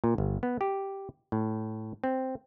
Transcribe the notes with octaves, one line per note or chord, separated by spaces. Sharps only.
A#2
G1
B3
G4
A2
C4